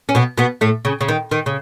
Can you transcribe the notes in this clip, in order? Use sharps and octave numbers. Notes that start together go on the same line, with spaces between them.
C#4
B2 B3
B2 B3
A2 A3
C#3
C#3
D#3
D#3
C#3